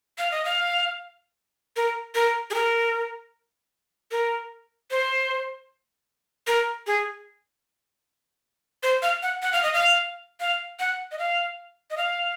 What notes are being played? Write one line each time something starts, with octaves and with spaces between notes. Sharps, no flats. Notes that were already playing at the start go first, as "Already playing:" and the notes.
F5
D#5
F5
A#4
A#4
G#4
A#4
A#4
C5
A#4
G#4
C5
F5
F#5
F#5
F5
D#5
F5
F5
F#5
D#5
F5
D#5
F5